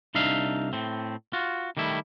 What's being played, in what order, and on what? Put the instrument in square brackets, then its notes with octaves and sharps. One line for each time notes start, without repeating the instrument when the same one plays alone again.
[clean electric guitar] C2 D4 D#4 E5 F5
A2 C4
F4 F#4
D#3 G3 A3 E4